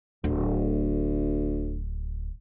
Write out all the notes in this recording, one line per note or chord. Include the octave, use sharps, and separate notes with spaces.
D1 D2